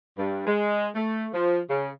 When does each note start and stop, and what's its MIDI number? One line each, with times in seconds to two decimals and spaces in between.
0.18 0.43 43
0.47 0.88 56
0.95 1.28 57
1.34 1.60 53
1.69 1.90 49